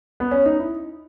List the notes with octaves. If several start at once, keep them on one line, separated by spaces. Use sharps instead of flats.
B3
C#4
D#4
E4